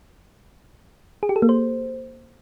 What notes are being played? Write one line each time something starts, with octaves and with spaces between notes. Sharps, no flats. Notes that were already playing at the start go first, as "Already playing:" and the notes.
G#4
G4
A4
A#3
C5